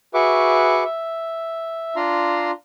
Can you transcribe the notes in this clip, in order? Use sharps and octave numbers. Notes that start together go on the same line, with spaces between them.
F#4 G#4 B4 E5 C#6 D6
E5
D4 F4 A#5 C6